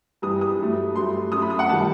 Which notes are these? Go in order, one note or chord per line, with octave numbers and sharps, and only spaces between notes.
G2 E3 G3 D#6
D#6
G2 F#3 A3
G2 F#3 A3 C6
F#2 F#3 A3 D#6
B5
D#6
F#5
D#3 G3 A5